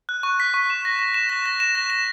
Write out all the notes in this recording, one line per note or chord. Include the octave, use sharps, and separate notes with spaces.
F#6
C#6
B6
C#6
E7
A#6
A#6
E7
A#6
A#6
E7
A#6
E7